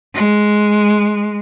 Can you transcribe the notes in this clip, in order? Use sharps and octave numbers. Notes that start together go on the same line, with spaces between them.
G#3